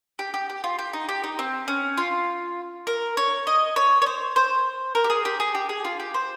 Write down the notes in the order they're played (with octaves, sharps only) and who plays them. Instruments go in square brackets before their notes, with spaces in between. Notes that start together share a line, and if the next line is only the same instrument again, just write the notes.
[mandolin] G4
G4
G4
F4
G4
D#4
G4
D#4
C4
C#4
F4
A#4
C#5
D#5
C#5
C#5
C5
C5
A#4
G4
G#4
G4
G#4
G4
G#4
F4
G4
C5